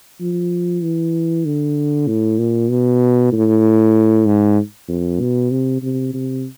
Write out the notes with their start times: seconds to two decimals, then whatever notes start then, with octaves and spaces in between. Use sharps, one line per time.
0.20 F3
0.82 E3
1.45 D3
2.07 A2
2.38 A#2
2.70 B2
3.32 A2
4.26 G#2
4.88 F2
5.20 B2
5.51 C3
5.82 C3
6.13 C3